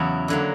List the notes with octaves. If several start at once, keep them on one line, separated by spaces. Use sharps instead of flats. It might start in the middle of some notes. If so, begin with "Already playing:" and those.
Already playing: E2 C#3 F#3 E4
D3 F#3 A#3